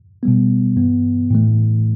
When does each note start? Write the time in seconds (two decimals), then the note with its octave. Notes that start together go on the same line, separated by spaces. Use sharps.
0.23 B2 G3 B3
0.76 G2 E3 B3
1.31 A2 E3 A3